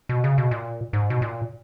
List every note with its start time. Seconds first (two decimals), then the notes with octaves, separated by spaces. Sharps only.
0.09 B2
0.24 C#3
0.38 B2
0.51 A#2
0.93 G#2
1.10 B2
1.22 A#2